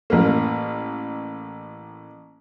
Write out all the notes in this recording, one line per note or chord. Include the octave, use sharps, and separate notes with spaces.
A1 A#3